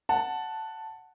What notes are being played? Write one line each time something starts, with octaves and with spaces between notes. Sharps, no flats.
F#5 A5